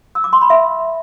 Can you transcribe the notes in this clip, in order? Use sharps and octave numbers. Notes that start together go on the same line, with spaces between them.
E6
D6
C6
B5
E5